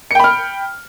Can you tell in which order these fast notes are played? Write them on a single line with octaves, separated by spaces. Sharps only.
C#7 G5 B5 F6